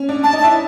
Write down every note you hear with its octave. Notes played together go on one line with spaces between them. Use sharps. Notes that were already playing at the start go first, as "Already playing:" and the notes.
Already playing: C#4
D4
D4 A5
D#4
A5
E4